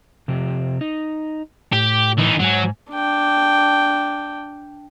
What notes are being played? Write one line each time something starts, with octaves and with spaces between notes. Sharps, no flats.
C3 F3 G4
D#4
A2 G4
E3 D#4
G#2 F#3 G#5
D4 G5